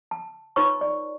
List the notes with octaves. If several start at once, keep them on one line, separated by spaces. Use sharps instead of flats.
A5
D#4 F4 B4 C#5 A5 C#6
D5